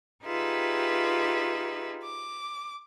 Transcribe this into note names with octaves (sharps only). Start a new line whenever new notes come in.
D#4 F4 G4 G#4 B4 E5
D6